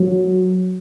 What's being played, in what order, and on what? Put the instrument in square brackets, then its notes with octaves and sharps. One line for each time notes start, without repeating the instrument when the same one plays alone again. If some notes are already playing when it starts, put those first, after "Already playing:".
Already playing: [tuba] F#3